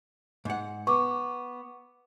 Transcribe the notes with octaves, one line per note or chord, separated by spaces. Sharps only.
G#2 F#5
B3 C#6 D6